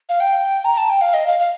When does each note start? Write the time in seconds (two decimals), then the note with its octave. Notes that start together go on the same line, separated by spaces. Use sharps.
0.09 F5
0.20 G5
0.65 A#5
0.77 A5
0.90 G5
1.01 F5
1.14 D#5
1.27 F5
1.39 F5